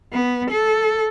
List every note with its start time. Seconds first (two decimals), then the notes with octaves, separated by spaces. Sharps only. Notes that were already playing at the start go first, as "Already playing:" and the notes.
0.12 B3
0.50 A4